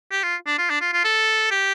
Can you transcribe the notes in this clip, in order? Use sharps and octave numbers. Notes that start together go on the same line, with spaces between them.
G4
F4
D4
F4
D4
F4
F4
A4
G4